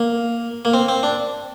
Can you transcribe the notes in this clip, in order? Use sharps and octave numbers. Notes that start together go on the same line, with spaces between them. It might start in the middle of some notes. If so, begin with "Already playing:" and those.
Already playing: A#3
A#3
C4
C4
D4